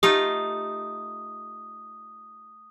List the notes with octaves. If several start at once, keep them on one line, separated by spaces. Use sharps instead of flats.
A3 D#4 F4 G4 D#6